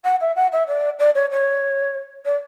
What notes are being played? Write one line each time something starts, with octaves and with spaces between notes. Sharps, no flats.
F#5
E5
F#5
E5
D5
D5
C#5
C#5
D5